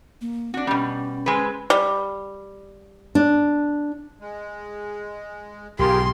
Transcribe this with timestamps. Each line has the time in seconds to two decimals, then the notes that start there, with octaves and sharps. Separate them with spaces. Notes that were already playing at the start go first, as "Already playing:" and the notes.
0.21 A#3
0.54 C4 D4 F#4
0.67 B2 G3 C#4
1.26 G#3 C4 B4
1.70 G3
3.15 D4
4.21 G#3
5.79 B1 G#2 F4 G4 G#4 A#4 C6